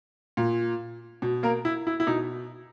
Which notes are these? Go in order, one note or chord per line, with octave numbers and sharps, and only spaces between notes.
A#2
B2
A#3 A#4
E4
E4
E4
B2 D#4